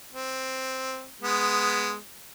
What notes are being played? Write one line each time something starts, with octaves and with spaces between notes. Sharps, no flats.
C4
G#3 B3